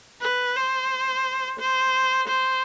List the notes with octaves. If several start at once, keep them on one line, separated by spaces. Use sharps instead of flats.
B4
C5
C5
C5